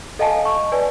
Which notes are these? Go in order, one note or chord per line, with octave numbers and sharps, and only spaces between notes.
A4 D#5 F5 F#5 G#5 A5
C#6
B4 D5 G#5